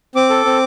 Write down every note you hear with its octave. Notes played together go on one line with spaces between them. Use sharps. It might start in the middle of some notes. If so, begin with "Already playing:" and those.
C4 D6
A4
C4